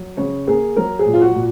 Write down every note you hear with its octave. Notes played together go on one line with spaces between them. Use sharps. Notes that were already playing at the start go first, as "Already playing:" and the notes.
Already playing: F#3
C#3 C#5
A#3 G#4
F#3 A#4
G#4
A#2
F4
F#4
A#2